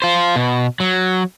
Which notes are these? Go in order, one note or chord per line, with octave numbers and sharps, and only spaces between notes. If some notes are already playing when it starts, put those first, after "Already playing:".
F4 C5
B2
F#3